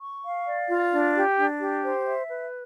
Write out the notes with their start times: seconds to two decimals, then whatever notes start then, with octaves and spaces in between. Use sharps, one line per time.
0.01 C#6
0.24 F5
0.47 D5
0.69 F4
0.92 D4
1.15 G4
1.38 D4
1.60 G4
1.83 C5
2.06 E5
2.29 B4